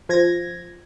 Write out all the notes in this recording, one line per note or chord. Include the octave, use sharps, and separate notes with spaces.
F3 G#6 A#6